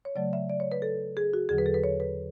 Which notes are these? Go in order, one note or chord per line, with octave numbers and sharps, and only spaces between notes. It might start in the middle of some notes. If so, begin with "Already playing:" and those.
C#5
C#3 F#3 A3 D5
E5
D5
C#5
B4
A4
G#4
F#4
E2 D3 F#3 G#4
B4
A4
B4
C#5
B4